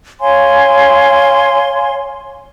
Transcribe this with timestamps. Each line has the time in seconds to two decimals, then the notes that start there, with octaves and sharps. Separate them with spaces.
0.21 C#5 F5 G#5 C6